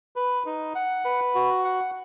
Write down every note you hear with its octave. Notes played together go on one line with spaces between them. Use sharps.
B4
D#4
F#5
B4
F#4
F#5